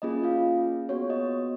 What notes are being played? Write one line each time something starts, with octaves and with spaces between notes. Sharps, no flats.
A#3 C#4 F4 G#4 D#5
F4 F5
B3 F#4 C#5
D#5